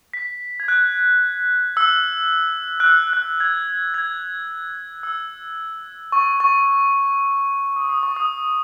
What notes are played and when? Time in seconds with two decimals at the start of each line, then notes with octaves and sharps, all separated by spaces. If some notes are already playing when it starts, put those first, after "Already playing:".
0.13 B6
0.60 G#6
0.68 F#6
1.77 E6
2.80 F#6
2.86 E6
3.13 F#6
3.40 G#6
3.94 G#6
5.03 E6
6.12 C#6
6.40 C#6
7.76 D#6
7.89 D#6
8.03 C#6
8.16 D#6